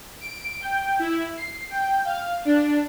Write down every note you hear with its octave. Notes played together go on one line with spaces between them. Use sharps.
D7
G5
E4
C7
G5
F5
D4